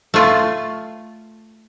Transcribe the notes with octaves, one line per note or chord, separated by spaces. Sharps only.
A3 F4